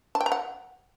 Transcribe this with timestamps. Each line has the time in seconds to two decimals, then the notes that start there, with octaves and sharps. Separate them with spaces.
0.15 A5
0.21 G5
0.26 A#5
0.32 F#5